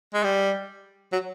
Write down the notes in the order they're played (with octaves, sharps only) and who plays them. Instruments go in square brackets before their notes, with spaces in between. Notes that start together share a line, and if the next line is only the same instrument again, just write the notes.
[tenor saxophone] G#3
G3
F#3